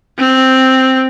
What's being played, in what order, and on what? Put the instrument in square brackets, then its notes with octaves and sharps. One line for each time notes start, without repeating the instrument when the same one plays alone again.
[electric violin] C4